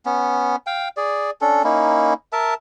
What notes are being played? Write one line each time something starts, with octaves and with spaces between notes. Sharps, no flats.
B3 C#4
F5 G5
G#4 D5
C#4 D4 A4
A#3 C#4 D#4 E4
A#4 E5 A5